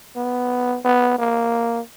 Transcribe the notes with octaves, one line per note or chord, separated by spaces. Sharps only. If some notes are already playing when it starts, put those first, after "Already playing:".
B3
B3
A#3